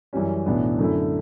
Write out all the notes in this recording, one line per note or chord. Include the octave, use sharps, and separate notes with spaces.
F#2 E3 G3 C#4
B1 A2 E3 B3 D4
F#2 D3 A3 E4